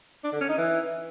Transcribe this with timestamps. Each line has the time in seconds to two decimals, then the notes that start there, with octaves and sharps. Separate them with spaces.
0.24 D4
0.32 D3
0.41 C#4
0.49 D#4
0.58 E3